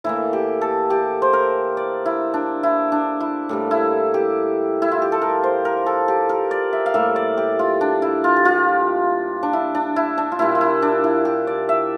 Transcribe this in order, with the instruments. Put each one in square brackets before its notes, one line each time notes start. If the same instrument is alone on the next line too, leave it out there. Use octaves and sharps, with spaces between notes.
[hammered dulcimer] A2 E3 A#3 E4
G4
A4
G4
C5
A#4
D5
E4
D4
E4
D4
E4
A2 G3 A#3
E4
G4
E4
F4
G4
A4
A#4
C5
A#4
A4
G4
A#4
D5
E5
F5
A2 G3 A#3 E5
D5
G4
F4
D4
E4
F4
G4
F4
D4
E4
D4
E4
D4
F4
A#2 G3 A#3 E4
F4
E4
D4
E4
G4
D5
E5